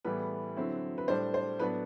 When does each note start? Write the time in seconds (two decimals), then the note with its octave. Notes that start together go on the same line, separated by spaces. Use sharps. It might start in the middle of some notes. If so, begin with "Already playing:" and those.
0.05 A2 E3 G3 B3 B4
0.56 D3 F#3 C4 E4
0.98 B4
1.08 A2 G3 D4 C5
1.34 C5
1.59 A2 F#3 B3 D4 B4